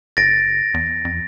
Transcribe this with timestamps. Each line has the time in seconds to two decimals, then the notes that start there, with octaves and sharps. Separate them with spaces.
0.17 F#1 A6 A#6 D7
0.74 E2
1.05 F2